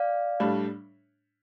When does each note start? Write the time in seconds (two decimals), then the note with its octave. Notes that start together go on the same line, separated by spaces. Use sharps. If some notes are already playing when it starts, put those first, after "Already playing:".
Already playing: D5 F5
0.40 A2 G3 D4